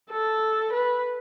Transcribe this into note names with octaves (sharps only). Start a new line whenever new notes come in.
A4
B4